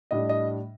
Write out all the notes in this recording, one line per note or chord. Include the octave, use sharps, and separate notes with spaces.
A2 G3 D4 D#5
D#5